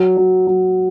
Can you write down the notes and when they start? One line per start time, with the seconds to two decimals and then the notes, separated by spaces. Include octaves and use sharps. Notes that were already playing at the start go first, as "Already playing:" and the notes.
Already playing: F#3
0.17 F#3
0.47 F#3